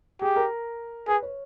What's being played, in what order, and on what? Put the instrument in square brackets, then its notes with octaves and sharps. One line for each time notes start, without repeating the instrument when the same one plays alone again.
[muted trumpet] G4 [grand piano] G#4
[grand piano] A#4
[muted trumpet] G#4 [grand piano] B4
[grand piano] C#5